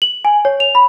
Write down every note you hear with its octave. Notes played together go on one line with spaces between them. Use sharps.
F#7
G#5
C#5
F7
B5